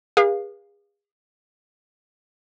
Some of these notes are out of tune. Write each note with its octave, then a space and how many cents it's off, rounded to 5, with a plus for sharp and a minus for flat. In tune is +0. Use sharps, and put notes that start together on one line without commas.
G#4 -35 B4 -40 F5 +0